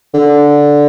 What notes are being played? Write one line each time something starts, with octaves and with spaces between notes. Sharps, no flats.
D3